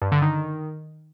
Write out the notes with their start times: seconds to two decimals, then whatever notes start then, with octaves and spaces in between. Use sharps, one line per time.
0.02 G2
0.12 D3
0.22 D#3